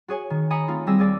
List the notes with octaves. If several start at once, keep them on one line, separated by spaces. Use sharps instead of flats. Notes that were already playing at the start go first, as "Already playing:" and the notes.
F#4 G#4 C#5 G#5
D#3
D#5 G#5 A#5 B5 D#6 C#7
A3 C4 D#4 F4
G3 C4 G#4 D#5 E6 A#6
D#2 G#4 D5 E6